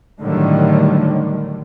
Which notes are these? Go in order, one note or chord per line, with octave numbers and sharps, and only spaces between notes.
A2 D3 D#3 F#3 G3